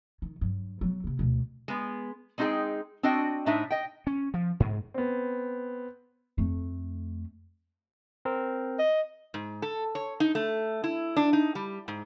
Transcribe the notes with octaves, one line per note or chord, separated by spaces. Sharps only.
D#3
G2 F#3
F#3 B3
C3 A#3
D2 B2
G#3 B3
G#3 C4 D#4 F4 G#4 G5
C4 D4 F#4 D#5 G5
A2 D4 D#4 E5
D#5 G5
C#4
F3
G#2
B3 C4
F2 A3
C4 A#4
D#5
G#2
A4
C#5
D#4
A3
E4
D4
D#4
G3
G#2